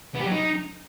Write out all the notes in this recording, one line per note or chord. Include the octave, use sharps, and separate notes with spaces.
B3
G4
F#3
D#4